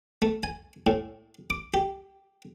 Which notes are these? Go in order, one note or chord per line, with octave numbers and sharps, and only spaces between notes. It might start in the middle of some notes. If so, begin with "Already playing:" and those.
A3
G#5
A2
D6
G4